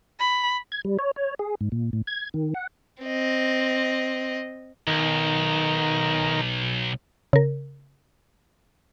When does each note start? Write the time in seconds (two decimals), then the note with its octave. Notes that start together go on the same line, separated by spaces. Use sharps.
0.19 B5
0.72 G#6
0.85 G3
0.99 C#5
1.16 C#5
1.39 G#4
1.61 G#2
1.72 A#2
1.93 A2
2.07 G#6
2.34 D#3
2.54 F#5
3.03 C4 D#5
4.87 B1 D#3 A#4
7.33 C#3 A#4